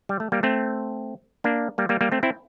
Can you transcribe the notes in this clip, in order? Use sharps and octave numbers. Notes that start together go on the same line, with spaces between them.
G3
A3
G3 A#3
A3 C4
A#3 D4
G3 A#3
G3 A#3
G3 A#3
A3 C4
C4 E4